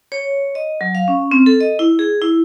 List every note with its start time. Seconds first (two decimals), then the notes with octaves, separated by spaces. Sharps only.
0.12 C#5
0.55 D#5
0.81 F#3
0.95 F5
1.08 C#4
1.31 C4
1.46 A4
1.61 D#5
1.79 E4
1.99 G#4
2.22 E4